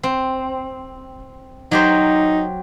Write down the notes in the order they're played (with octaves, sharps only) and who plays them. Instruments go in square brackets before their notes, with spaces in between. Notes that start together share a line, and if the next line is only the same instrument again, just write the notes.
[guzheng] C4
[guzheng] F#3 G4 C5 [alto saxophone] D#4